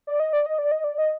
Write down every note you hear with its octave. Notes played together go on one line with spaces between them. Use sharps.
D5
D#5
D5
D#5
D5
D#5
D5
D#5